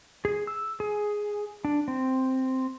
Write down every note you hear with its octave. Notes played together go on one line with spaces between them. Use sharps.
G#4
E6
G#4
D4
C4